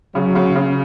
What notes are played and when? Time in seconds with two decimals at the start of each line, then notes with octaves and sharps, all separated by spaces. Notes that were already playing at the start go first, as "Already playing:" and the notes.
0.15 C#3 F#3
0.35 C#3
0.55 C#3